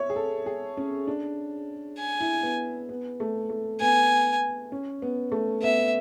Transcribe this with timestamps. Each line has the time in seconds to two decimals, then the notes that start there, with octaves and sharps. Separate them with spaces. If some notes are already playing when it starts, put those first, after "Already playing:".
Already playing: C#5 E5
0.10 G#4
0.16 A4
0.46 G#4
0.77 C#4
1.07 D4
1.99 G#5
2.20 E4
2.43 B3
2.89 B3
3.20 A3
3.49 A3
3.80 B3 G#5
4.72 C#4
5.02 B3
5.32 A3
5.63 B3 E5